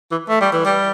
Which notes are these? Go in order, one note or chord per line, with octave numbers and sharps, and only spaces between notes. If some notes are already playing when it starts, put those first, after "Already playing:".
E3
A3
G3
E3
G3